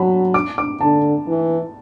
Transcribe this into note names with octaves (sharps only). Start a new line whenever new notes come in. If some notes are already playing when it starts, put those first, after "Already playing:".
Already playing: F#3 A5 B5
D6
D6
D3 A5
E3